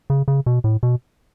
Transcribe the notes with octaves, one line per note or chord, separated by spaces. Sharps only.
C#3
C#3
B2
A2
B2